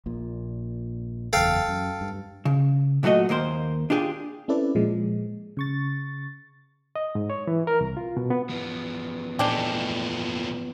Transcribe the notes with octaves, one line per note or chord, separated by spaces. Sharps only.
A#1 A#2
F#1 E2 A4 F5 G5
F#2
G2
C#3
A#2 F#3 A3 F#4 D#5
D#2 A#3 A#4 C5
D4 F4 G4 G#4
C4 C#4 E4 A4 B4 D5
A#2 F3 G#3
C#3 C#6 A6
D#5
G#2
C#5
E3
A#4
C2
F4
B2
B3
E3 F3 B3
A#2 G#3 A3 D4 G4